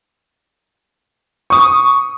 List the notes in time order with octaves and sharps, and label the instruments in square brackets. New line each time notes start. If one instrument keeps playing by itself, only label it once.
[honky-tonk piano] C#6 D#6